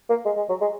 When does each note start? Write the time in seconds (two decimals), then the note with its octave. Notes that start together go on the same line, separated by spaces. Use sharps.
0.10 A#3
0.25 G#3
0.37 G#3
0.49 F#3
0.61 G#3